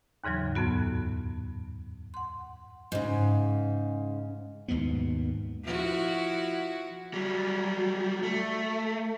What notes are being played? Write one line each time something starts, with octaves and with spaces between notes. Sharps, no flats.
D#2 G#2 C#3 E3 F#3
F2 A2 B3 F#4
F#5 C6
G#2 C#3
D#2 G#2 B2 B3
F3 E4 F#4
F#3 G3
A3